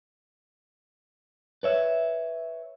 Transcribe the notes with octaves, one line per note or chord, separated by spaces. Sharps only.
B4 C#5 E5